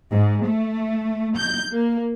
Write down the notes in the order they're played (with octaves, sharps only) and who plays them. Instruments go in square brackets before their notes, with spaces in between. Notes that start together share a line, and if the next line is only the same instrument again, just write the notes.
[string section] G#2
A3
G6
A#3